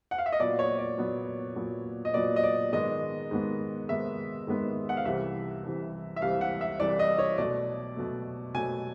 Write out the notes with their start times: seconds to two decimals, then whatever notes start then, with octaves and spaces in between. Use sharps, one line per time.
0.11 F#5
0.18 F5
0.26 E5
0.32 D#5
0.40 A#2 F#3 B3 D5
0.59 C#5
0.79 D5
0.98 A#2 F#3 B3
1.56 A#2 F#3 B3
2.05 D#5
2.14 A#2 F#3 B3 D5
2.36 D#5
2.43 D5
2.72 G#2 D#3 G#3 B3 D#5
3.31 G#2 D#3 G#3 B3
3.89 G#2 D#3 G#3 B3 E5
4.47 G#2 D#3 G#3 B3
4.89 F#5
4.97 F5
5.05 C2 C3 E3 E5
5.63 C2 C3 E3
6.16 E5
6.22 C2 C3 E3 F5
6.41 F#5
6.61 E5
6.80 C2 C3 E3 D5
6.99 D#5
7.19 C#5
7.38 B2 F#3 A3 D5
7.96 B2 F#3 A3
8.54 B2 F#3 A3 G#5